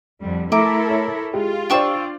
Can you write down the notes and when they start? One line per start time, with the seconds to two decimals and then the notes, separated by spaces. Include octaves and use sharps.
0.22 F2 D3 G3
0.52 A3 E4 A4 A#4 E5 A#5 D6
0.90 C#5
1.34 G#3 F4 G4
1.70 D4 C5 D5 G5 C#6 E6